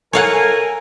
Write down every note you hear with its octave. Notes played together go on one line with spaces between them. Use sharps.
A4 A#4 C#5 F5 F#5 G#5